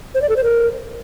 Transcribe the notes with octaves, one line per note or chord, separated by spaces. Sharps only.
C5
D5
A4
C5
A#4